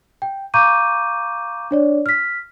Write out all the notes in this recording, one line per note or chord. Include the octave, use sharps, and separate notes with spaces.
G5
F5 A#5 C#6 D6 G6 D#7
D4 C#5 D5
F6 B6